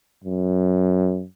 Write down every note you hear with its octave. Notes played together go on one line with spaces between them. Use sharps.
F#2